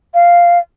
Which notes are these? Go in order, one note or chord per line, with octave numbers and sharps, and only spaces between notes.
F5